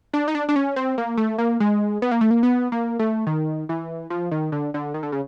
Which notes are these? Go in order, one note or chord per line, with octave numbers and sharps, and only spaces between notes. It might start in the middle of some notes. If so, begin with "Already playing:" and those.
D4
D#4
D4
D4
C#4
C4
A#3
A3
A#3
G#3
B3
A#3
A3
A#3
B3
A#3
A3
D#3
E3
F3
D#3
D3
D3
D#3
D3
C#3